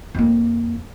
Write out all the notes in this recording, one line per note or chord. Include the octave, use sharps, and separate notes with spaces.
F2 A#3